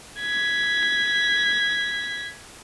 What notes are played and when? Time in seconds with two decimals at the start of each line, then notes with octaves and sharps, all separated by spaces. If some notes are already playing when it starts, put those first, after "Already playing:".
0.21 G#6 B6